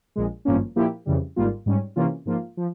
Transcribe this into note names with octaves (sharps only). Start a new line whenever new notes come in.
A#1 A#2 G#3
G#1 G2 F3 A#3 C#4
A#2 F3 A#3 E4 G4
F2 C#3 E3 G3
G#1 G#2 G3 A#3 F4
G#2 G3 C#4
C3 E3 A#3 C#4 F4
G#2 F3 A#3 F4
F3